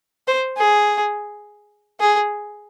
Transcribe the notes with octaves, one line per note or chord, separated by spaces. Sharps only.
C5
G#4
G#4